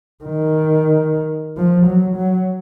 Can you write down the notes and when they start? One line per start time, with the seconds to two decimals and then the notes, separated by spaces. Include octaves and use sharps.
0.24 D#3
1.57 F3
1.86 F#3
2.17 F#3